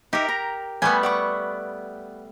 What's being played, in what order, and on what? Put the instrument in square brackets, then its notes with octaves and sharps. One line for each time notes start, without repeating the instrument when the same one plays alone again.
[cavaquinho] D#4 E5 [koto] G4 A#4
[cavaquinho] A#5
[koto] G3 A3 B3 [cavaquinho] G#5
[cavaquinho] D5 F#5 C#6